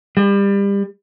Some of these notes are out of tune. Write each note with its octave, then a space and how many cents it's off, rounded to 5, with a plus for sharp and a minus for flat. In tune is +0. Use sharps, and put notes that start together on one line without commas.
G3 +30